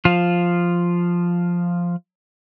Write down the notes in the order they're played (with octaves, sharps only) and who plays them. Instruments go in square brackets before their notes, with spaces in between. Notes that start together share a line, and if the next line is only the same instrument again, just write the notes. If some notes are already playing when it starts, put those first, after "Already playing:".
[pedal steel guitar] F3 F4